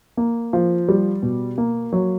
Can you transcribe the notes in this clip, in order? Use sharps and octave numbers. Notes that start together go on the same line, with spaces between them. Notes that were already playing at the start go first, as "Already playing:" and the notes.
A#3
F3
G3
B2
A#3
F#3